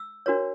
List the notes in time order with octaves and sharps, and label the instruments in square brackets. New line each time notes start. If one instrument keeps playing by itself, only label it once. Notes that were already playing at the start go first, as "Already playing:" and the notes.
Already playing: [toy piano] E6
D4 F#4 A#4 C#5